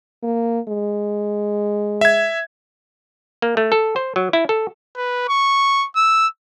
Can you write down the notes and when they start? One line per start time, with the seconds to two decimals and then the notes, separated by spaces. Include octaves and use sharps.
0.23 A#3
0.68 G#3
2.01 E5 G#6
3.42 A#3
3.57 A3
3.72 A4
3.96 C5
4.16 F#3
4.33 E4
4.49 A4
4.97 B4
5.29 C#6
5.96 E6